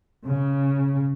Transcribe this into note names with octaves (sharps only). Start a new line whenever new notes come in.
C#3